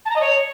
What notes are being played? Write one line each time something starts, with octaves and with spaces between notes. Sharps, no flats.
A5
A#5
D#5
C#5